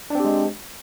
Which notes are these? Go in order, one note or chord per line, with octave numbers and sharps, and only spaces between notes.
G#3 C4 D4 G4